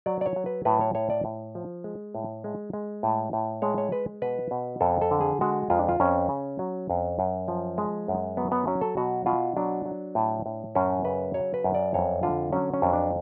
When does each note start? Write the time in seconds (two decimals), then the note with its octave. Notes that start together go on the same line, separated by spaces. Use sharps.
0.06 F#3 D5
0.21 D5
0.26 C#5
0.36 F#3
0.46 B4
0.65 A2 B4
0.81 C#5
0.95 A2 C#5
1.10 D5
1.25 A2
1.55 F3
1.84 G#3
2.15 A2
2.44 G#3
2.73 G#3
3.03 A2
3.33 A2
3.62 G#3 C#5
3.78 C#5
3.92 G#3 B4
4.22 B2 B4
4.51 B2
4.81 F2 A4
5.02 A4
5.11 D3
5.21 G#4
5.41 G#3 F#4
5.70 F2 F4
5.79 D4
5.89 F4
6.00 F2 C#4
6.29 C#3
6.59 F#3
6.90 F2
7.19 F#2
7.48 F3
7.78 G#3
8.08 F#2
8.37 F#3 B3
8.52 B3
8.67 F#3 C#4
8.81 A4
8.97 B2 F#4
9.26 B2 F4
9.57 F#3 D4
9.86 F#3
10.15 A2
10.46 A2
10.75 F#2 C#4
11.05 C#3 B4
11.34 F#3 C#5
11.54 B4
11.64 F#2
11.75 D5
11.94 F2 C#5
12.23 D3 F4
12.53 F#3 C#4
12.74 C#4
12.82 F2
12.93 D4